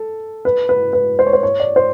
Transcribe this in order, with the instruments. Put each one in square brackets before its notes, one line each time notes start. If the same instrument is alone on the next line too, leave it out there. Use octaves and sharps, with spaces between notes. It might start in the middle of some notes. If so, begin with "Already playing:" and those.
Already playing: [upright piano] A4
B4
B4
B4
C5
C#5
C5
C#5
D5
C5